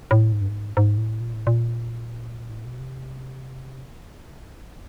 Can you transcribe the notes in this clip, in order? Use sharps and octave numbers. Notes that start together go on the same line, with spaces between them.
A2
G#2
G2
G#2
G#2
A2
A#2
A2
A#2
A2
B2
C3